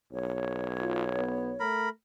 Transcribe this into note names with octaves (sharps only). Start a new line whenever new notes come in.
B1 C#5
F4
B3
A3 A#4 B5